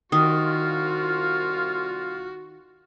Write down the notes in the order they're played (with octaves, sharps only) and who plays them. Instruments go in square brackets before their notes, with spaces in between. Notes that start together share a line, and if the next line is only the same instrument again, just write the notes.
[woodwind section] C2 F4 [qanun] D#3 [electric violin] F#4 [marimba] D#6